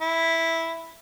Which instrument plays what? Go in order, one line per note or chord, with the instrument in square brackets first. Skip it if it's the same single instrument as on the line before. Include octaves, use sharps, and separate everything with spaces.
[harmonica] E4